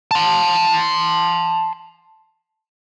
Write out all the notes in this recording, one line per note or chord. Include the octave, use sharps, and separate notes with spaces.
A5 C6